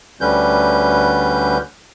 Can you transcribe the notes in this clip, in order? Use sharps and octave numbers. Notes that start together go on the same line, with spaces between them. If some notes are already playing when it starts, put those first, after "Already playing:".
D2 D3 G3 C#4 B4 G6